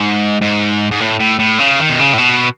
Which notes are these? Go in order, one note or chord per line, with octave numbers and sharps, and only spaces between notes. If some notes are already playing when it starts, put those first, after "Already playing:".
Already playing: G#2
G#2
G#2
A2
A2
A2
C#3
D#3
B2
C#3
A2
B2